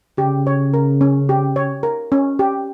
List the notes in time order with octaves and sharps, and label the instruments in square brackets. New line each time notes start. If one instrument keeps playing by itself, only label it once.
[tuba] C#3 [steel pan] G4
[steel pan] C#5
A#4
C#4
G4
C#5
A#4
C#4
G4